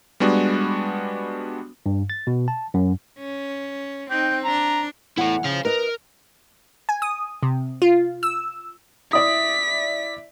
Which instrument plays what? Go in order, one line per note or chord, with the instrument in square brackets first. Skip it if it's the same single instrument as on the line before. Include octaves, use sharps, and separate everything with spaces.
[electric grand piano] G3 G#3 B3 D4 F#4
[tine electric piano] G2
A6
B2
A5
F#2
[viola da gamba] C#4
[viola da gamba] C4 D#4 [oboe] G5
[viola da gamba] D4 [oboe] A#5
[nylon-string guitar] E2 E3 F#5 [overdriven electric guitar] E4 A4
[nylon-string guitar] C#3 [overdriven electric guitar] C5 F5
[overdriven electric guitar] A#4 [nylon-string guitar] B4 D#5
[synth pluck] G#5
D#6
C3
F4
E6
[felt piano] E4 D5 E5 [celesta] D#6 [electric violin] B6